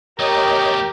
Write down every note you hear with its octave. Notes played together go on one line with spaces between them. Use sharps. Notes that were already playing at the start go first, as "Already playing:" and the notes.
E2 A3 G4 A#4 C#5 D#5 G5